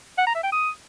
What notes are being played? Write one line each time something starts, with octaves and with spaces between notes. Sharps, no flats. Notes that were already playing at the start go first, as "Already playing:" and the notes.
F#5
A#5
E5
G5
D#6